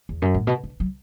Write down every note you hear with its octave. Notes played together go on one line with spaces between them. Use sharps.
E2
F#2
A2
B2
D3
F#3